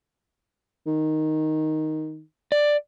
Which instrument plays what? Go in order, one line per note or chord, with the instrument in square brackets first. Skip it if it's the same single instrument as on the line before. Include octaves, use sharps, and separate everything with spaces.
[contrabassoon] D#3
[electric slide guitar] D5